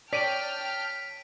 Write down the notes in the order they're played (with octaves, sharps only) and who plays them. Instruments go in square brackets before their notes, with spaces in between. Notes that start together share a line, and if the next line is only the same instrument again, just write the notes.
[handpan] C#5 [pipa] D5 [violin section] G5 A5 F6 [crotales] B6 D7 D#7